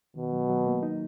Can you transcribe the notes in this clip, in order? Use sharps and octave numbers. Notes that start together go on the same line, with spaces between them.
B2 D#3
F#3
F#3
A#3
D#4